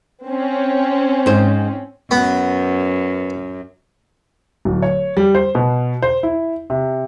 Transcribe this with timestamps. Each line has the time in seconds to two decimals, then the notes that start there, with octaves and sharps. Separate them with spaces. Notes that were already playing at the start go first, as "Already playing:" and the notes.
0.25 C4 C#4
1.26 G#2 C5
2.11 F#2 B3
4.65 D1
4.82 C#5
5.17 G3
5.35 C5
5.55 B2
6.02 C5
6.23 E4
6.70 C3